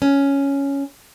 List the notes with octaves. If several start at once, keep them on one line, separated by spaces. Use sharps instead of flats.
C#4